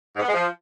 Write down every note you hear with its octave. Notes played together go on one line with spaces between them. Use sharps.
G#2
B3
G#3
F3